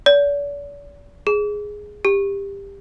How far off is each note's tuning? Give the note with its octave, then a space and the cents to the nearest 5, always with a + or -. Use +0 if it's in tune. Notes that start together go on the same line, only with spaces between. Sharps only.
D5 -45
G#4 +0
G4 +20